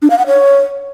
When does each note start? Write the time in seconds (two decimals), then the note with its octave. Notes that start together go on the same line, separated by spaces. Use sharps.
0.02 D4
0.10 F5
0.19 F#5
0.27 C#5